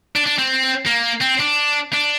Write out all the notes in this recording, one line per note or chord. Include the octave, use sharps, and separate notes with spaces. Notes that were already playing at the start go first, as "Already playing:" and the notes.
D4
D4
C4
A#3
C4
D4
D4